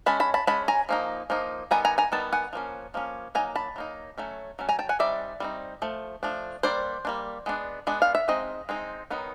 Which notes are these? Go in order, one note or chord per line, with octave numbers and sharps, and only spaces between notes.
G#3 C#4 A5 B5
A5 B5
A5 B5
G#3 C#4 A5 B5
G#5 A#5
F3 A#3 D#4
F3 A#3 D#4
D#3 G3 B3 G#5 A#5
G#5 A#5
G#5 A#5
D#3 G3 B3 A5
F#5 G#5
F3 A#3 C#4
F3 A#3 C#4
F#3 A#3 D#4 G#5 A#5
A5 B5
F#3 A#3 D#4
F#3 A3 C#4
F#3 A3 C#4
G#5 A#5
G5 A5
F#5 G#5
G3 C4 D#4 D5 E5
G3 C4 D#4
F3 A3
F3 A3 D4
G3 A#3 D4 C5 D5
G3 A#3 D4
G#3 B3 D4
G#3 B3 D4
F5
E5
G#3 C4 D#4 D#5
G#3 C4 D#4
D#3 F#3 B3 D#4